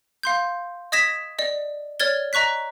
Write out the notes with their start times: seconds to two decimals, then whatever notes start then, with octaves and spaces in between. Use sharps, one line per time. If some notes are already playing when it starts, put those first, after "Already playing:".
0.23 F5 C6 G6
0.92 D#5 D#6 G#6 A#6 B6 E7
1.39 D5 D#5
2.00 C#5 D5 F6 G#6 A6 G7
2.33 D#5 A#5 C#6 F#6 B6